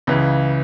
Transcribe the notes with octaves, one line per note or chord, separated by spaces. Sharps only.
C#2 C#3 E3